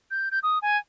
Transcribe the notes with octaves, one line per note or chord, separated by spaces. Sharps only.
G6
G6
D#6
G#5